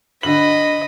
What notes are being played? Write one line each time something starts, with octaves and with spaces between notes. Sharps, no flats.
D3 D#5 B5 F#7